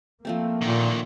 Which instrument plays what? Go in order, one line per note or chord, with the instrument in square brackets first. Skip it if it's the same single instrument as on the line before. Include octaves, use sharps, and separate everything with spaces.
[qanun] F3 A3 C4 [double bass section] A#3
[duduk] A#2 [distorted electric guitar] D3 D#3